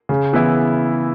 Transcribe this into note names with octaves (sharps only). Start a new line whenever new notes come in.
C#3
E3 B3 E4